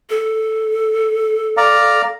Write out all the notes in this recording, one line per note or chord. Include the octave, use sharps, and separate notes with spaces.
A4
D5 F5 A#5